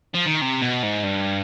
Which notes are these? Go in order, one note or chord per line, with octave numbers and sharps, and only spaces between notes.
F3
D#3
C3
B2
G#2
G2